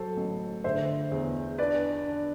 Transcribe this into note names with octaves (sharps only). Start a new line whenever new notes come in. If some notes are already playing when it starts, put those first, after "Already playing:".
Already playing: F#3 A4 C5
A1
D3 C5 E5
E2
D4 B4 D5
D4